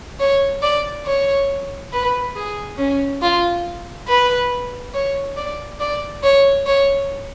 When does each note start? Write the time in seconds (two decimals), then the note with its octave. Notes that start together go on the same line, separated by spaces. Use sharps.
0.20 C#5
0.62 D5
1.06 C#5
1.92 B4
2.36 G#4
2.78 C#4
3.22 F4
4.08 B4
4.94 C#5
5.37 D5
5.80 D5
6.23 C#5
6.66 C#5